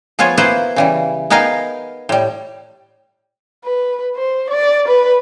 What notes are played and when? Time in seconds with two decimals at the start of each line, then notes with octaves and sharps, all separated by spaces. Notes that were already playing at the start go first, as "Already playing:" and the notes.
0.19 F3 B3 F4 G#4 C#5
0.37 A#3 B3 E4 B4 C5
0.76 C#3 E3 G3
1.30 B3 D#4 G#4 A#4 F5 G5
2.09 A2 G3
3.64 B4
4.16 C5
4.50 D5
4.88 B4